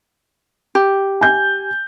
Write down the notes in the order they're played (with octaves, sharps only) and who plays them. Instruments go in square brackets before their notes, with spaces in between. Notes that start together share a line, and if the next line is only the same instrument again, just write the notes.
[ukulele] G4
[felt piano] G#5 G6